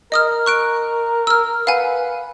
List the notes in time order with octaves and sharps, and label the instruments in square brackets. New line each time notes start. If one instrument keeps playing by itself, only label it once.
[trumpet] A#4 [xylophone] D#5 D#6 F6
[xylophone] C#6 F#6 D7
E6 F6
[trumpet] B4 [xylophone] F5 F#5 G#5